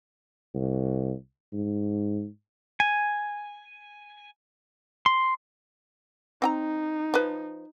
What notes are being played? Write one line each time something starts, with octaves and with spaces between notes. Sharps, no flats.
C2
G#2
G#5
C6
C4 D#4 G5 A#5
F3 B4